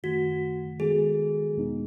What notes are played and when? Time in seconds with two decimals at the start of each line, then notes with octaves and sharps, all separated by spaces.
0.03 F#2 D#3 A3 F#4
0.80 D#3 G#3 B3 F#4 G#4 A4
1.56 E2 B2 G#3 B3 D#4